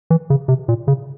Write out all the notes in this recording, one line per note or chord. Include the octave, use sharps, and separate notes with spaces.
E3
C#3
C3
A#2
C#3